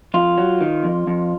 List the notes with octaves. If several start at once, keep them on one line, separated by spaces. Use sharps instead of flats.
F2 F4
F#3
D#3
F2
F2